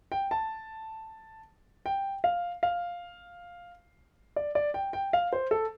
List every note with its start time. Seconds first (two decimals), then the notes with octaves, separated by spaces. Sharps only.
0.12 G5
0.31 A5
1.86 G5
2.24 F5
2.63 F5
4.36 D5
4.55 D5
4.74 G5
4.93 G5
5.13 F5
5.33 C5
5.51 A4